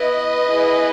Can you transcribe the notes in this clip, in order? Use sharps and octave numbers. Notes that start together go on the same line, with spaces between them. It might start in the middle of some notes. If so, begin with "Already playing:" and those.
Already playing: B3 E4 B4 D#5
B3 E4 G#4